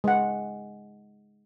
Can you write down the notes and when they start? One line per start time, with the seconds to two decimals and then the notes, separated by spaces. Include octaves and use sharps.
0.04 G#3 F#5